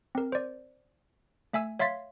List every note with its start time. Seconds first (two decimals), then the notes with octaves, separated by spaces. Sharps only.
0.15 C4 A#4
0.32 C5 D5
1.53 A3 E5 G#5 E6
1.79 C#5 E5 F5 C6 A6 B6